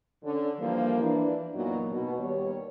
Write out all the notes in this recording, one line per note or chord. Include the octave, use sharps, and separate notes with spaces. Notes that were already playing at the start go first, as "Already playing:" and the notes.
D3 C#4
E3 F3 G3 A#3 D4 E4
E3 D4
F#2 A#2 F#3 A#3 B3 D#4
B2
D#2 D#3 G3 C#5